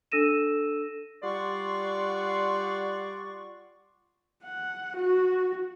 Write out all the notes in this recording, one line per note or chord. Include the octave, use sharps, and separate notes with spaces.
D4 A4 E6 A#6 D#7 E7
G3 F4 D5 F#5 C6 C#6
F#5
F#4